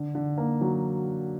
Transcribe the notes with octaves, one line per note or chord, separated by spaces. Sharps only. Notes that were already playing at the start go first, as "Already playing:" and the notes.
Already playing: D3
D3
A#3
F#3